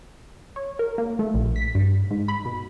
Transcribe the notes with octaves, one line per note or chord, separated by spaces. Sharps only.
C#5
A#4
A#3
A3
A#1
B6
G2
G#2
B5
B2